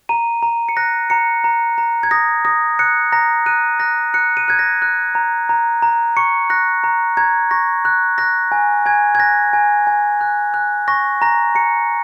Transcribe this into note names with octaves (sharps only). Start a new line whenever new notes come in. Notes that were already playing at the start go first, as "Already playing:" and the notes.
A#5 D#7
A#5
C#7
F#6 A#6
A#5 C#7
A#5
A#5
G#6
D#6 A#6
D#6 A#6
F#6 C#7
A#5 A#6
F#6 D#7
F#6 A#6
F#6 C#7
D#7
F#6 G#6
A#6
F#6
A#5
A#5
A#5
C#6 C#7
F#6 A#6
A#5
A#5 G#6
C#6 A#6
F#6
F#6 A#6
G#5
G#5 G#6
G#6
F#6 A#6
G#5
G#5
F#6
F#6
C#6 A#6
A#5 A#6
A#5 C#7